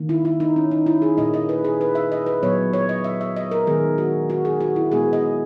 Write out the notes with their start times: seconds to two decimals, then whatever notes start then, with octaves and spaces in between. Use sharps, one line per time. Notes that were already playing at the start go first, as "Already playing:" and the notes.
Already playing: D#3 A#3
0.09 E4
0.25 E4
0.40 D#4
0.56 C#4
0.71 D#4
0.86 E4
1.02 G#4
1.17 A#2 A#3 D#5
1.34 D#5
1.49 B4
1.65 G#4
1.81 B4
1.95 E5
2.12 D#5
2.26 B4
2.43 A#2 F#3 B3 C#5
2.73 C#5
2.89 D#5
3.04 E5
3.21 E5
3.37 D#5
3.51 A#4
3.67 D#3 G#3 B3 G#4
3.98 F#4
4.30 F#4
4.45 G#4
4.60 F#4
4.76 E4
4.91 A#2 G#3 B3 G#4
5.13 D#5